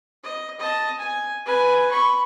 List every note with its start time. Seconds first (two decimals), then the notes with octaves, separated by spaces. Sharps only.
0.24 D#5
0.59 D#5 A5
0.99 G#5
1.46 B4 G#5
1.91 B5 C#6